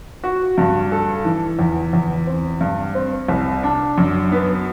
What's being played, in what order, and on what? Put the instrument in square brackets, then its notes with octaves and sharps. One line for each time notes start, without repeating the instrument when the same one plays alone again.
[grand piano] F#4
G2
A4
E3
E2
E2
C4
G2
C4
C2
D4
F#2
B3